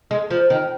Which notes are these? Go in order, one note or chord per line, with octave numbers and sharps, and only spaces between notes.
G#3
F3
D#3